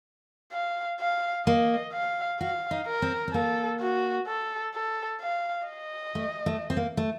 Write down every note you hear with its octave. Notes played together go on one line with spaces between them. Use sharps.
F5
F5
A#3 D#5
F5
F#4 F5
D#4
A#4
C4
C4
A#3 A4
F#4
A4
A4
F5
D#5
A3
A3
C4
A#3
A3